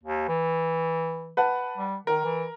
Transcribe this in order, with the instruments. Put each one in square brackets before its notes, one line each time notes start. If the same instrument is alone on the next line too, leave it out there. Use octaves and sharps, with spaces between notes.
[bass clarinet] D#2
E3
[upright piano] B4 F#5 A5
[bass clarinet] G3
[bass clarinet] D#3 [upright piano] A#4
[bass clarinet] E3